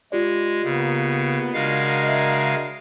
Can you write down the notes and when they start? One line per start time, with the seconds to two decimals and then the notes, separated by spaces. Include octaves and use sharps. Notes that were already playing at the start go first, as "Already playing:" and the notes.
0.12 G#3 F4 G4 D5
0.64 C#3 A#3 B3
1.54 C#3 G#3 D4 F#4 A#4 F5
2.04 D#5 E5